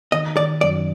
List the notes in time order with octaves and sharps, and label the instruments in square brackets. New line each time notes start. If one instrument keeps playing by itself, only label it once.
[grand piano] D#3 [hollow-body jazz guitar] D#5
[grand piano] D#3 [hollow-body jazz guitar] D5
[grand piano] F#2 [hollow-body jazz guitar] D5